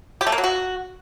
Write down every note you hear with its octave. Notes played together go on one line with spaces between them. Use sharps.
G4
A3
A#3
F#3
F#4